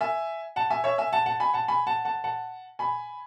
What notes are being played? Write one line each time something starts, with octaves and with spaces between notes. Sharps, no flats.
E5 G#5
F#5 A5
E5 G#5
C#5 E5
E5 G#5
F#5 A5
F#5 A5
G#5 B5
F#5 A5
G#5 B5
F#5 A5
F#5 A5
F#5 A5
G#5 B5